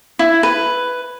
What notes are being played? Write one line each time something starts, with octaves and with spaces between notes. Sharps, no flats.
E4
B4